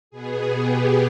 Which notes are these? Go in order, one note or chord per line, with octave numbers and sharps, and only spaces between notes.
B2 B3 G#4
G4